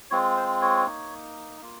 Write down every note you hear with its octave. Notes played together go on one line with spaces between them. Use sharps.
G#3 C4 F4 C#5
C5
C#5
A#3 D#4
A#3 F4